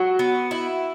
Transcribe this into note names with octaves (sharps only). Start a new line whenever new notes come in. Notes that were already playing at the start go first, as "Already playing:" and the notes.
Already playing: F#3 F#4
B3
E4